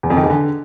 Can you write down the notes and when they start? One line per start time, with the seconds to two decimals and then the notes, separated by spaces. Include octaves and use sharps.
0.03 E2
0.10 F2
0.17 D#3
0.23 E2
0.30 D3